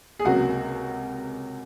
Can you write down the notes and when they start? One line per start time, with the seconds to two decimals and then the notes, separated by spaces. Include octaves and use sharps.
0.19 G#4
0.25 C#2 C3 F#3 A#3 F#4